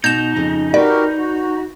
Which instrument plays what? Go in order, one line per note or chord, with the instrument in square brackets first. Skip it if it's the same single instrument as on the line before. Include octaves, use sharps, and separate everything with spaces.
[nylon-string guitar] B2 [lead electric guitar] D#4 [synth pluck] G6 E7
[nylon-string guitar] F2 C#3
[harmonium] F#4 G4 A#4 [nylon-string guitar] B4 [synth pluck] D5
[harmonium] F#4